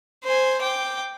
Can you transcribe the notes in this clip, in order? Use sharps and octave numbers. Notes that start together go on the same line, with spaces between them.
C5 G#5
G5 D6